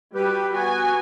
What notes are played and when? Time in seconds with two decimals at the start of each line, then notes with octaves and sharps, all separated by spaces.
0.15 G3 F#4 G4 B4
0.52 B3 F#4 G#5